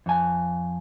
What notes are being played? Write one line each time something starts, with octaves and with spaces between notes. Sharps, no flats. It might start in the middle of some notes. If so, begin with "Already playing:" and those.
F2 G#5